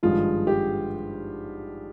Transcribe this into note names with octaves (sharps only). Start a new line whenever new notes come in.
G#1 G2 F3 G#3 F4
G4